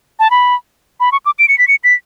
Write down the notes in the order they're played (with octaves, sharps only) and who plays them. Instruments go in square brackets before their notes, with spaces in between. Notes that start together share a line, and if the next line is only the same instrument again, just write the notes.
[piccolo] A5
B5
B5
C#6
D6
D7
C#7
B6
C#7
B6